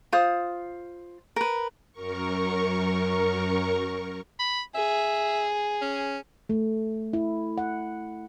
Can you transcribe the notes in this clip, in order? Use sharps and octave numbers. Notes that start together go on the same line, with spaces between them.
F4 C5 D#6
A#4 B4
F#2 A#4 C#6
B5
G#4 E5
C#4
A3
E4
F#5